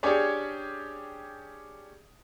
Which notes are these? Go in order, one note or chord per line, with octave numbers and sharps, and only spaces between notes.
C#4 D4 G4 G#4 C#5 D5